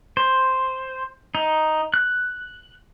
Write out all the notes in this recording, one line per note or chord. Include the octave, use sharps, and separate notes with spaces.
C5
D#4
F#6